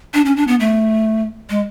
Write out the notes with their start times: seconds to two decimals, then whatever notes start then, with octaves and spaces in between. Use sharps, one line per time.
0.14 D4
0.25 C#4
0.37 D4
0.48 B3
0.60 A3
1.50 G#3